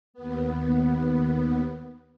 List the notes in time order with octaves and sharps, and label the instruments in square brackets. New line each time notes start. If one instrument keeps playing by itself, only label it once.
[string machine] D#2 B3